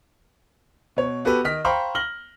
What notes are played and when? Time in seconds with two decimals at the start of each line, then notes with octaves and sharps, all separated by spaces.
0.97 B2 C#5
1.25 B3 F#4 G4 A4 B4
1.44 D#3 D#5 F6 B6
1.65 C5 F5 G5 A#5 B5 C#6
1.95 F6 A#6 F#7 G7